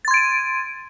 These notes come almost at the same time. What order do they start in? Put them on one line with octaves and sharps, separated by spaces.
A6 C6 G#6 D7 D#7